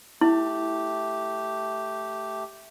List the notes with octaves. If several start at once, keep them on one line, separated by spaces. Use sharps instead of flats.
A3 E4 G4